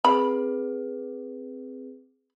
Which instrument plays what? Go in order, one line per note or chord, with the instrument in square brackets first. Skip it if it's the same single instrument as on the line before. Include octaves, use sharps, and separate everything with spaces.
[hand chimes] C4 G#4 B4 [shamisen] B5